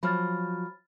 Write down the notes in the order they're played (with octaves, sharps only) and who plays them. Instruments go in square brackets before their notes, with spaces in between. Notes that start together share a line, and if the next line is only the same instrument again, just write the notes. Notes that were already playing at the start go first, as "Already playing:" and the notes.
[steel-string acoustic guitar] F3 F#3 [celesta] B5 F6 A6